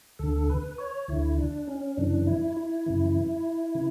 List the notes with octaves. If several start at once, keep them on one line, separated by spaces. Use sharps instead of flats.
D2 D3 A4
B4
C#5
D2 D3 E4
D4
C#4
F#2 C#3 E3 D4
E4
E4
F#2 C#3 E3
C#3 E3